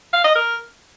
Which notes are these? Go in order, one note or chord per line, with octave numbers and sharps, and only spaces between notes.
F5
D#5
A#4